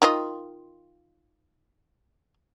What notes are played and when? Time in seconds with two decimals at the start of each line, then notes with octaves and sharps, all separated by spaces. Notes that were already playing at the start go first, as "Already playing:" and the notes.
0.02 D#3 F4 D#5